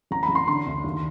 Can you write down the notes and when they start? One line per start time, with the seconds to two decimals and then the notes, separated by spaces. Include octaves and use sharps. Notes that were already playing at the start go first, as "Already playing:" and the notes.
0.11 A1 A#5
0.23 B5
0.29 A1
0.35 C6
0.47 D3 C6
0.67 D2
0.84 D#2